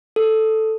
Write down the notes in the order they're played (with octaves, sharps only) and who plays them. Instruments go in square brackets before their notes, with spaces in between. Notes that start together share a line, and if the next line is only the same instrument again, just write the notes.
[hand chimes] A4